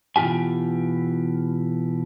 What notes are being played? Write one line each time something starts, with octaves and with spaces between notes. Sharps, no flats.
B2 E3 F4 G4 G#5